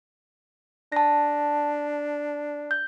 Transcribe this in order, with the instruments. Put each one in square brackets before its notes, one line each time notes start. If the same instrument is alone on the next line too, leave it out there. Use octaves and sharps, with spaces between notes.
[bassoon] D4 [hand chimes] A5 A#6
[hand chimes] G6